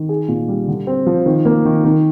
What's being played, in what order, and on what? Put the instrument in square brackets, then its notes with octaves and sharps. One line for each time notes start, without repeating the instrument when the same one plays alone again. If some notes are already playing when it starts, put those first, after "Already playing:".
Already playing: [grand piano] D#3
G#4
A#2
G3
D3
C4
F3
D#3
A#3
D#3
D#3